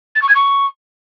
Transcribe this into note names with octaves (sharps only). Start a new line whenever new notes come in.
A6
C#6
G#6
C#6